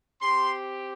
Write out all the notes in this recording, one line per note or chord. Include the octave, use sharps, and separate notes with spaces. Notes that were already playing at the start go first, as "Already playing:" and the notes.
C4 G4 C6